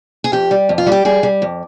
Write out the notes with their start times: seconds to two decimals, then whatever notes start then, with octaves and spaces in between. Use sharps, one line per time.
0.24 G#4
0.32 F2 G4
0.51 G3
0.69 F2
0.78 F4
0.87 G3
0.92 G4
1.05 G3 G#4
1.23 G3
1.42 F2